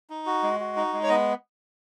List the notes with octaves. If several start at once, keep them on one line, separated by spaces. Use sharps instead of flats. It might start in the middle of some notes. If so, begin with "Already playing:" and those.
D#4
F#4
G#3
F#4
D#4
G#3
C#5
B3 D#5